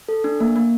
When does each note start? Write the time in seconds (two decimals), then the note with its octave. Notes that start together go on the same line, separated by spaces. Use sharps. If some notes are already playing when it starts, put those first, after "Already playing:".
0.09 A4
0.24 D4
0.40 A#3
0.56 A#3